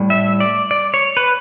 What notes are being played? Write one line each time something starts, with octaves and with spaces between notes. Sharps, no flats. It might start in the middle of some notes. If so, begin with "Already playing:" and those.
Already playing: A2 G3
E5
D5
D5
C#5
B4